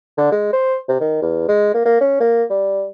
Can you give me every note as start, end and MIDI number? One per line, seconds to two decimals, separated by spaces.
0.18 0.32 50
0.32 0.50 56
0.53 0.77 72
0.89 1.00 48
1.01 1.22 51
1.22 1.48 40
1.48 1.69 56
1.74 1.82 58
1.86 1.98 58
2.01 2.20 61
2.20 2.43 58
2.50 2.87 55